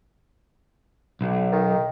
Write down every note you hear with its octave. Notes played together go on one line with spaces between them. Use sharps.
B1
D#3